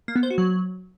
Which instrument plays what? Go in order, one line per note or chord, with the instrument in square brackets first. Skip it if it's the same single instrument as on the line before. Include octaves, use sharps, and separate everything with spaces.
[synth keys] A#3
B3
C5
F#4
F#3